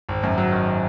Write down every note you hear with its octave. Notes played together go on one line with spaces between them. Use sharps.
G#1
F#2
F#3
D#3